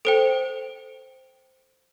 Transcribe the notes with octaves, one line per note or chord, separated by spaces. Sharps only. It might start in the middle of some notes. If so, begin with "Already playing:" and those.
A4 C5 G5 D7